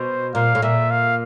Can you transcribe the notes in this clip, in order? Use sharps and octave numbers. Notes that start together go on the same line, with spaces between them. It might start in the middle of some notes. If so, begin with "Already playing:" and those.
Already playing: B2 C5
A#2 F5
A2
A#2 E5
F5